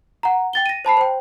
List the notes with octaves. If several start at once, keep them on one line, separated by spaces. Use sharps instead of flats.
F#5 A#5
G5 A6 G7
A#6 D#7
C5 A5 B5 C7
C5 G5